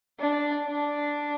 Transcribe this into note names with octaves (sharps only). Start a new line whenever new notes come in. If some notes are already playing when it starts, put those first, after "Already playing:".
D4
D4